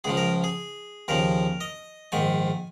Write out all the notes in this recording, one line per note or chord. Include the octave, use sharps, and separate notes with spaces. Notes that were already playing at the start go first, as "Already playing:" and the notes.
C#2 C#3 F3 G#4
A#4
G#4
D#2 C#3 F3 A#4
D#5
A#1 G#2 D#3 G#5